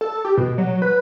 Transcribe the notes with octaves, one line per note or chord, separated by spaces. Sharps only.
A4
G4
B2
F#3
B4